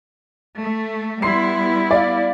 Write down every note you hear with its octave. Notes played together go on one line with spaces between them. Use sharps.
A3
G3 B3 E4 C6 C7
D5 F5